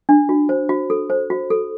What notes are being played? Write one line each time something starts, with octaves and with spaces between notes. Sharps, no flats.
D4
F#4
C5
F#4
A4
C5
F#4
A4